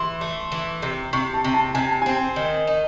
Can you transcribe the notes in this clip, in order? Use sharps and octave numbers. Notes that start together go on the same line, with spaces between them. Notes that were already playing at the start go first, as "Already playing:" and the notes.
Already playing: E3 C6
A3
E3
C3
C3 C#6
A5
C3
A5
C3 G#5
A5
C4 G#5
D#3
D#4